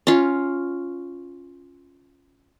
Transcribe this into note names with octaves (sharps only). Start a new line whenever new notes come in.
C#4 F4